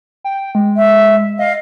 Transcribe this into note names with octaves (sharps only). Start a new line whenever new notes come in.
G5
G#3
E5
D#5 F5